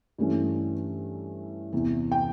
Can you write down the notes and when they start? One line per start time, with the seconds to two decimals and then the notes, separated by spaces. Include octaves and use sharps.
0.18 G2 E3 A3 C#4
1.72 E2 C3 E3
2.12 G5